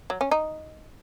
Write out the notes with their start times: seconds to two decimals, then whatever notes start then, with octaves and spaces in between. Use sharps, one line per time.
0.10 F#3
0.21 C#4
0.31 D#4